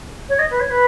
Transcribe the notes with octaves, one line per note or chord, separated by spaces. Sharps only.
C#5
D#5
B4
C#5
B4